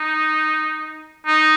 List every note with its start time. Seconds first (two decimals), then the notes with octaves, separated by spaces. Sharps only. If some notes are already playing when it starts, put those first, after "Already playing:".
Already playing: D#4
1.27 D#4